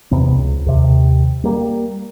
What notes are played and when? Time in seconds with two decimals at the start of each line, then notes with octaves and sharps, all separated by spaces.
0.11 E2 C3 B3
0.32 C#2
0.66 D#2 C3
1.44 G3 A#3